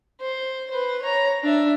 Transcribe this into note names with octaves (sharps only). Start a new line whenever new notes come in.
C5
B4 C5
C#5 A#5
D4 E5